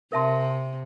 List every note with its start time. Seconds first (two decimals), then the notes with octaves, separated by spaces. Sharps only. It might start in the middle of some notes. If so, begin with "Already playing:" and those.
0.12 C3 A#4 E5 A5 C6